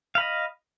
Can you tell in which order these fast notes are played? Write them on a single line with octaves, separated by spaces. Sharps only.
F5 B5 D#5